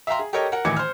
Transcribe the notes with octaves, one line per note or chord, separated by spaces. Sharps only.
E5 F5 G5 A#5 C6
G#4
G4 A4 A#4 C#5 D#5 G5
A#4 F#5
A1 D#3 E3 D6 G#6 C#7
C5 F6